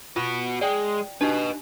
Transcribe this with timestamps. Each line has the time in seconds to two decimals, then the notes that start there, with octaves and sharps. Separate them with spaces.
0.16 B3 F4 F#4
0.61 G#3 D5 G5
1.21 D4 D#4 G4 B4 D#5